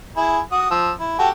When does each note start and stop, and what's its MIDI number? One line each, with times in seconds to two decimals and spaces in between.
0.17 0.39 64
0.17 0.39 68
0.52 0.68 66
0.52 0.68 87
0.71 0.91 53
0.71 0.91 88
1.00 1.17 64
1.19 1.29 66
1.19 1.29 67
1.19 1.29 69